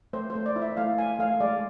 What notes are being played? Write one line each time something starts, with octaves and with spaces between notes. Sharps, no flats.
A3 C5
C5
A3
D5
E4
E5
A3 F5
A3 G#5
A3 F5
G#3 D5